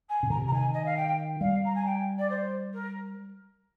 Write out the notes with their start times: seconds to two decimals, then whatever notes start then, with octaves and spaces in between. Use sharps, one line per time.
0.09 G#5
0.23 C3
0.30 D3 A#5
0.37 C3
0.48 A#5
0.52 D#3 G#5
0.73 D#5
0.85 F5
0.96 G5
1.41 G3 F5
1.65 A#5
1.75 G#5
1.85 G5
2.18 D5
2.29 C5
2.73 A#4